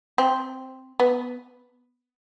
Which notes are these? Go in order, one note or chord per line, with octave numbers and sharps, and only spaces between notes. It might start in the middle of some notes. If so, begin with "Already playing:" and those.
C4
B3